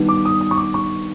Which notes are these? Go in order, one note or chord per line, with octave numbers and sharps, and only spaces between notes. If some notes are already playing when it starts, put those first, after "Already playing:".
Already playing: D#3 G3 B3 D4
D6
D#6
D#6
C#6
D6
C#6